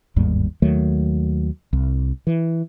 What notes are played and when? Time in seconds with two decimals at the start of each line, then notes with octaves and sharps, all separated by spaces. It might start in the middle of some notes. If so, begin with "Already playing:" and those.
0.16 G1 D#2 G#2 G3
0.62 D#2 D#3 F#3 A3
1.73 C2
2.27 E3